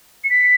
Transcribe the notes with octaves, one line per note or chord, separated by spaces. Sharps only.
C#7
B6